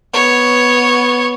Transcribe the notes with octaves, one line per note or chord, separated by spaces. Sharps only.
B3 C#5